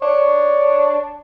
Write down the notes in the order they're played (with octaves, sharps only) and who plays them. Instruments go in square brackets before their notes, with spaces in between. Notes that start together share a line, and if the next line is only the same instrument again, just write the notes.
[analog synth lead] D4 [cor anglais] C#5